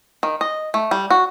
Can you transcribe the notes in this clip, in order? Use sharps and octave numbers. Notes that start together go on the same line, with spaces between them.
D#3
D#5
A3
G3
F#4